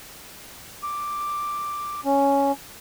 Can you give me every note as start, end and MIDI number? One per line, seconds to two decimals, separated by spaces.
0.83 2.01 86
2.05 2.52 61